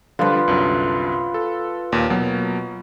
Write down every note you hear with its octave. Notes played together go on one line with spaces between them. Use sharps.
D3 F3 G3 F4 B4
C2 F#2 D3
A4
D#2 A#2
B2 F#3 A#3